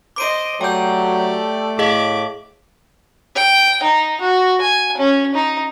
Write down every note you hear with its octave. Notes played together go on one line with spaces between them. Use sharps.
C5 D#5 D6 D7 D#7
F#3 A3 G4 D5 G5 G6
A2 G#4 D#5 F5 D6
G5
D#4
F#4
G#5
C#4
D#4